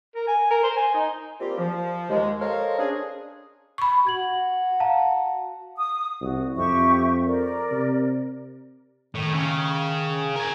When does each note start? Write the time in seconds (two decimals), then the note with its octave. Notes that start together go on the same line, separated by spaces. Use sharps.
0.15 A#4
0.28 G#5
0.51 A#4
0.64 C5
0.77 G#5
0.94 D#4
1.41 G3 A#3 C4 F4 G4
1.58 F3
2.10 D#2 G#3
2.41 A4 A#4 C5 C#5 D#5 F5
2.79 C#4 D4 G#4
3.78 B5 C#6
4.07 F#4 G#6 F#7
4.80 F5 A5 A#5
5.77 D#6
6.21 C2 F#4
6.56 F2 G4 E5 C#6
7.26 A#4 D5
7.71 C3
9.15 A2 D#3
9.34 C#3
10.36 A#4 G#5